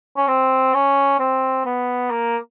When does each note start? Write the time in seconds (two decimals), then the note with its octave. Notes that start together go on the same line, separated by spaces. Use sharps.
0.16 C#4
0.27 C4
0.74 C#4
1.19 C4
1.65 B3
2.11 A#3